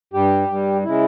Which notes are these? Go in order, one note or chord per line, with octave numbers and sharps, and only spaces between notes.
G2 G3 G4
G2 G3
C#3 G#3 E4